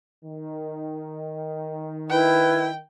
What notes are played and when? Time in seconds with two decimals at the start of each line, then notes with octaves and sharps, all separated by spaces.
0.24 D#3
2.11 E4 B4 G5